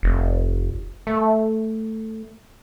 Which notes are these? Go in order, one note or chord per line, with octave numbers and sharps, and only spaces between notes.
F1
A3